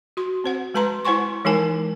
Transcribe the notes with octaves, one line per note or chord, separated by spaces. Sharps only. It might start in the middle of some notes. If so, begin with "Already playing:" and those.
F#4 C6
C4 C5 F#5
G#3 B4 A5 A#5 C6
E4 C5 F#5 G#5 C6 C#6
E3 G#3 D#4 A#4 G#5 A5